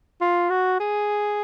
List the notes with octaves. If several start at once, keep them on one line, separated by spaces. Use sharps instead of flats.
F4
F#4
G#4